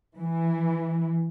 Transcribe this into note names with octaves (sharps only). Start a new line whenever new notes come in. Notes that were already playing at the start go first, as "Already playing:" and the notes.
E3